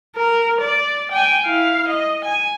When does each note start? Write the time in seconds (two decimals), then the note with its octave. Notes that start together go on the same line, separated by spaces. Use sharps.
0.16 A#4
0.61 D5
1.12 G5 G#5
1.45 E4 F5
1.88 D#5
2.25 G#5